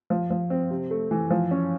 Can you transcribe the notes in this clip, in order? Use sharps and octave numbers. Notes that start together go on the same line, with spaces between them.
F3
F3
C4
C3
A3
E3
F3
C#4